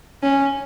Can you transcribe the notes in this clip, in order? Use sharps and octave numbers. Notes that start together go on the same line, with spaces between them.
C#4